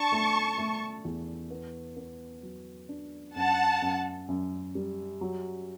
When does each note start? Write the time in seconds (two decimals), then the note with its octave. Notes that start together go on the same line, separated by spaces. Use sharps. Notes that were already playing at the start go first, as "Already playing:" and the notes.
Already playing: D4 A5 C#6
0.12 A3
0.58 A3
1.05 E2
1.50 B3
1.97 B3
2.43 F#3
2.89 D4
3.36 F#2 F#5 A5
3.82 F#2
4.28 F#2
4.75 G3
5.21 F#3